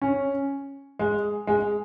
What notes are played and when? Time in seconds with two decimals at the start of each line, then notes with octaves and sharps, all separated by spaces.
0.02 C#4
0.99 G#3
1.47 G#3